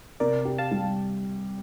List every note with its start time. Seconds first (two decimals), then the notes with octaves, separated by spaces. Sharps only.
0.20 C3 A#4 D5
0.45 G4
0.58 F5 A5
0.71 G3